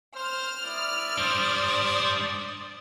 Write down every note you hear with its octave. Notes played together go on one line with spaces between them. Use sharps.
C5 F6
E4 D5 D#6
G3 D4 C5